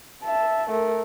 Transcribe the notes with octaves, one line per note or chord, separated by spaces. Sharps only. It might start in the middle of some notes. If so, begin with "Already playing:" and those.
E5 A5
A3 A#4